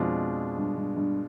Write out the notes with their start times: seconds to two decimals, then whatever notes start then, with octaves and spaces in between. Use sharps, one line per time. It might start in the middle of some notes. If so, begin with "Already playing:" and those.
Already playing: F2 B2 G#3 D4 F4
0.57 G2
0.77 G2
0.96 G2